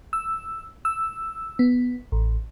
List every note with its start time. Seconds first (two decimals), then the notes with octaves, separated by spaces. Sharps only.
0.13 E6
0.85 E6
1.59 B3
2.12 A1